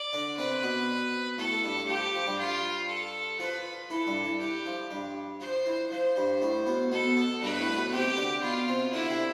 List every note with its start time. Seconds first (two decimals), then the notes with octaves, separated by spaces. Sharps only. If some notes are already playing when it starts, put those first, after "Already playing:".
Already playing: D5
0.13 D3 D4
0.38 C3 C4 B4
0.63 B2 B3
1.38 A2 A3 A4
1.64 G2 G3
1.77 G3
1.89 F3 G4
2.14 F3
2.27 G2 G3
2.39 F4
2.89 A4
3.39 F3 F4 B4
3.90 E3 E4 A4
4.07 G2 G3
4.24 E3
4.40 E3 G4
4.66 F3
4.91 G2 G3
5.40 F3 C5
5.66 E3
5.91 F3 C5
6.16 G2 G3
6.42 A2 A3
6.67 B2 B3
6.92 B2 B3 A4
7.17 B2 B3
7.42 G2 G3 B4
7.59 A2 A3
7.69 A3
7.76 B2 B3
7.92 C3 C4 G4
8.17 D3 D4
8.42 B2 B3 F4
8.68 C3 C4
8.93 D3 D4 E4
9.10 C3 C4